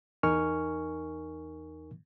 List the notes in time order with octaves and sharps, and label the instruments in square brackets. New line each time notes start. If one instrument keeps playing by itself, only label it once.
[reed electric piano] E2 D#4 A#4 G#5 C#6 F6